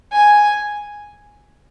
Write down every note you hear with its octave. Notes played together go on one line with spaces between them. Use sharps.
G#5